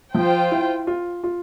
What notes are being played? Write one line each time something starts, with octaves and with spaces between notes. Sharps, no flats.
F3 F4 C5 G5
E4
F4
F4